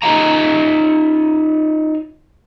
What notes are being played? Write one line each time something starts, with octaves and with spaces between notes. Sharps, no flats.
D#4 F4 C#5 D#5 F5 A#5